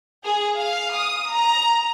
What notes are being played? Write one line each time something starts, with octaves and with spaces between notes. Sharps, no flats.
G#4
F5
D#6
A#5